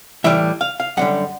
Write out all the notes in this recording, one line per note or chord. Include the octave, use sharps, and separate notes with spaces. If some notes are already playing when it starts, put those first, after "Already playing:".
A2 E3 G3 E5
F5
F5
F#2 D3 G3 F#5